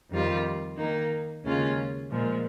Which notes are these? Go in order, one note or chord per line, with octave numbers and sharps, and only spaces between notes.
F2 D#3 G3 C4 F4
D#3 A#3 D#4
D#2 C#3 G#3 C#4 F4
A#2 F3 G#3